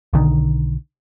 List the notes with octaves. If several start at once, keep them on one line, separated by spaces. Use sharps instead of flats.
B1 D3 D#3